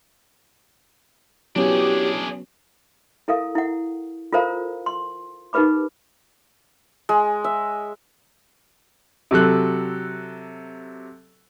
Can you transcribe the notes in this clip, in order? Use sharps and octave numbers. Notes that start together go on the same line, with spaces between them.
F#3 B3 C#4 D4 E4 G4 G#4 C#5
E4 A4 A#4 F5 D#6
E4 F#5
F4 A4 A#4 C5 F5 A#5
C6
D#4 G4 A#4 B4 B5 D6
G#3
E5
C3 F#3 A4 F#6